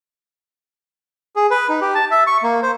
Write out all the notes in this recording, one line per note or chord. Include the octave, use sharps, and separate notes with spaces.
G#4
B4
D#4
G4
A5
E5
C#6
A#3
C5